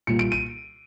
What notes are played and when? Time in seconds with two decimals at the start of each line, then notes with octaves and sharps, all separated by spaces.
0.07 A#2 G3 C#7
0.19 D7
0.32 D#7